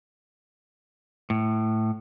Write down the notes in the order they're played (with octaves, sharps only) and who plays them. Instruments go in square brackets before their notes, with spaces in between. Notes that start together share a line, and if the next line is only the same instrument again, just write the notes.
[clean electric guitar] A2